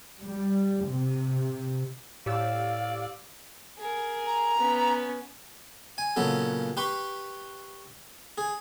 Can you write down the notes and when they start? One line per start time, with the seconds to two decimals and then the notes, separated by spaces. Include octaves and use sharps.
0.22 G3
0.85 C3
2.26 A2 G4 D5 F5 E6
3.78 G#4 A#4
4.26 A#5
4.58 B3 C#4
5.98 G#5
6.16 A#2 C#3 F#3 B3 A4
6.77 G4 B4 C6 C#6
8.38 G#4